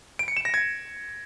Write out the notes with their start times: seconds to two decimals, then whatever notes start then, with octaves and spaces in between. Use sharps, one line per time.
0.19 D7
0.28 C#7
0.37 E7
0.45 A#6
0.54 G#6